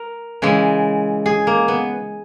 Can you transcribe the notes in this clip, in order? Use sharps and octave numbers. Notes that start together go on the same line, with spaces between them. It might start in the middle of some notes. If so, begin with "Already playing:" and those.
Already playing: A#4
C#3 E3 G#3
G#4
A#3
B3